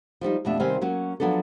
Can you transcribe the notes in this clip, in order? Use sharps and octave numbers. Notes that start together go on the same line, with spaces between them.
F3 G3 C4 D#4
F2 B2 A3 D4 E5
C3 D#3 G3 C4 F5 G#5
F#3 A#3 C#4 F#4
F3 F#3 B3 D4 A4